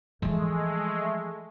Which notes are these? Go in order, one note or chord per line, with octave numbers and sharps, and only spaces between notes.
E3 F3 G#3 A3